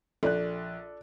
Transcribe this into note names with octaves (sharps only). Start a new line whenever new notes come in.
A#1 A4 D5 F#6